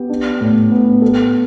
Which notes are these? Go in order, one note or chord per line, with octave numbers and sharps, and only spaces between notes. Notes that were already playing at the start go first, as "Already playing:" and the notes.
Already playing: B3 G4
D4
A2
B3
A4